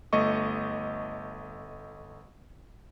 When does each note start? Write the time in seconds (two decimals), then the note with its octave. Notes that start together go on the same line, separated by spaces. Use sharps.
0.13 G1 A3 D#5 C#6